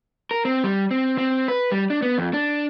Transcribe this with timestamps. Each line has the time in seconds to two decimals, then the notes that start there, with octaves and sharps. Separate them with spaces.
0.31 A#4
0.45 C4
0.64 G3
0.91 C4
1.18 C4
1.48 B4
1.72 G3
1.90 D4
2.02 B3
2.18 F2
2.34 D4